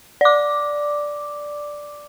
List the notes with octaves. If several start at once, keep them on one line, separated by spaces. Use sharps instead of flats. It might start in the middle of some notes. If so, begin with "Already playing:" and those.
D5 D6